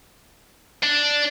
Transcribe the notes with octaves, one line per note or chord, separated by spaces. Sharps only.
D4